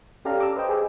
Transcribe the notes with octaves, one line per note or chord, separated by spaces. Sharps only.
C#4 G4 A4 D5 F5 A#5
D6 E6
B4 C5 D#5 G5
G#4